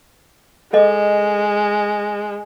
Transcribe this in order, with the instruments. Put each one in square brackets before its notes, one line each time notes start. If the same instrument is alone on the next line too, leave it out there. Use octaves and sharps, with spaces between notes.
[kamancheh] G#3 [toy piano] A4 D#5